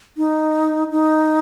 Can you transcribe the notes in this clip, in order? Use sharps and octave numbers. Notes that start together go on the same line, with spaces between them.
D#4
D#4